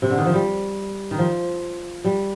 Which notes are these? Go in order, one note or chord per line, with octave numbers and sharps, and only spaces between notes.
C3
D3
D#3
F3
G3
D#3
F3
G3